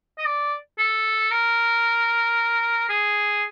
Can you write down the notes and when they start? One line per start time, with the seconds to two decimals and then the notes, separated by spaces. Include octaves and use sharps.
0.19 D#5
0.26 D5
0.78 A4
1.31 A#4
2.89 G#4